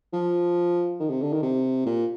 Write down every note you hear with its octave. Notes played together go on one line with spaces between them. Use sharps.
F3
D#3
C3
D3
D#3
C3
A#2